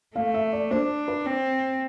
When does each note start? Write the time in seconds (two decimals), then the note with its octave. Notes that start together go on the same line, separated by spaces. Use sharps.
0.16 A3 F5
0.34 E5
0.53 D5
0.71 D4 C5
1.08 B4
1.26 C4